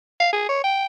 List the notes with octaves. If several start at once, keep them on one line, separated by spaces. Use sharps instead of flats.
F5
G#4
C#5
G5